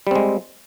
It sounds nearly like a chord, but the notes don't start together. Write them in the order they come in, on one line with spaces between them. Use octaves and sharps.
G3 C4 G#3